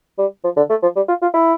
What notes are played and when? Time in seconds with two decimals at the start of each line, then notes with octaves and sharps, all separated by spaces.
0.18 G3
0.44 F3
0.57 D3
0.70 A3
0.82 F3
0.96 G3
1.08 F4
1.22 F4
1.34 E4